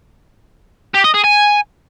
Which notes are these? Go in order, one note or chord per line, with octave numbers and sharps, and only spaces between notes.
G4
D#5
G#4
G#5